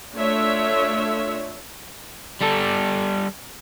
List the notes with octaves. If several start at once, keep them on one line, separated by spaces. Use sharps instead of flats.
A3 D4 F4 C#5 E5
G3 A4